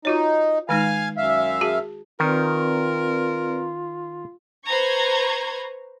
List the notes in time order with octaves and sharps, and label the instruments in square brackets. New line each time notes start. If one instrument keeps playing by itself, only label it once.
[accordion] D#4 [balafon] F4 F#4 C#5
[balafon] D#3 G#3 D#4 [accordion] F5 G#5 F6
[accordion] F#2 E5 F5
[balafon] F#4 G#4 A5
[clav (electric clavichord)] D#3 [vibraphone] C4 B4 D5 [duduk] F4 [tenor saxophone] A#4
[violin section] B4 C5 A#5 C#6 G#6